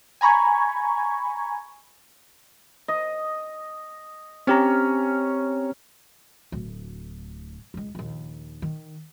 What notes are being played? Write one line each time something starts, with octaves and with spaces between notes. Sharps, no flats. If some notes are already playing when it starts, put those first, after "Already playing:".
G#5 A#5 B5 C#6 G#6
D#5
C4 C#4 G4 A#5
D1 D2
C#2 G#3
A#1 D#2
D#3